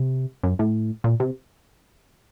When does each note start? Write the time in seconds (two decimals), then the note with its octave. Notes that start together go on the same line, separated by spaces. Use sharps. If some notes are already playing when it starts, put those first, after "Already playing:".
Already playing: C3
0.43 F#2
0.59 A2
1.04 A#2
1.20 C3